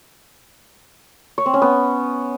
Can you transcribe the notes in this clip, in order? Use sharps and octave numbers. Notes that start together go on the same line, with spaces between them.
C#5
C4
C#4
B3